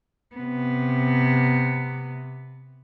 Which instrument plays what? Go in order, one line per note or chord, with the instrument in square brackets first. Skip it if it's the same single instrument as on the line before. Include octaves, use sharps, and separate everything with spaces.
[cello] C3 B3